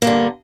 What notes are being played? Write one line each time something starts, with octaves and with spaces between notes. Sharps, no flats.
G2 D3 A#3